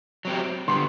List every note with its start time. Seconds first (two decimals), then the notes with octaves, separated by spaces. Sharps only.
0.25 F#3 C4 G4
0.68 D3 G3 B3 C6